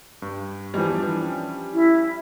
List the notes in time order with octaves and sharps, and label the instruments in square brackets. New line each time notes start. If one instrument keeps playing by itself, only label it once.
[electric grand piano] G2
[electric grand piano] E2 E3 [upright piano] F3 G3
[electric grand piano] E3 D4
C#4
[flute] E4